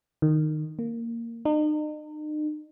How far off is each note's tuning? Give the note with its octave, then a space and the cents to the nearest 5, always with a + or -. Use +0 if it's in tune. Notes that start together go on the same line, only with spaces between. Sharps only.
D#3 -15
A#3 -10
D#4 -40